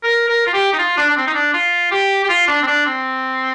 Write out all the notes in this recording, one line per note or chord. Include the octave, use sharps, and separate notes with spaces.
A#4
A#4
F4
G4
D#4
F4
D4
D4
C4
D#4
D4
F4
G4
G4
F4
D4
C4
D4
C4